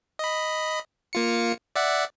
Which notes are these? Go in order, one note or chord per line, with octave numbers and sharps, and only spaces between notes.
D#5 B5
A#3 F4 C#7
D5 E5 F#5